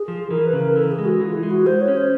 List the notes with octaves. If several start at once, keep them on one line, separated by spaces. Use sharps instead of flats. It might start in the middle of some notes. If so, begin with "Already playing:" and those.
Already playing: G#4
F3
E3 A#4
B4
C#3
A#4
E3 A4
G#4
G#3
F#4
E3
F4
E4
G#3
F#4
G#3 C5
C#5
C#4
C5